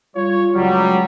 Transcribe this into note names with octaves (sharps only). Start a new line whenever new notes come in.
G3 F4 C#5
C#2 F#3 G3